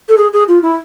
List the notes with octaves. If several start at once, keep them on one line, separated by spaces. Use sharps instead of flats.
A4
G#4
G#4
F4
E4